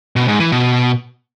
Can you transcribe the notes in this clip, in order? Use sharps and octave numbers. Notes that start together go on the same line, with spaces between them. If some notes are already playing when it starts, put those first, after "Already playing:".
B2
G#2
E3
B2